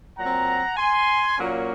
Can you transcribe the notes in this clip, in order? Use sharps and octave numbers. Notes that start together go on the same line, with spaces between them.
A#2 F#3 C4 F#5 A#5
G#5 C6
A#2 F#3 A#3 C#4